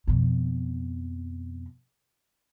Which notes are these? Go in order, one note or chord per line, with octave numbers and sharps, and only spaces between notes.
F2 B2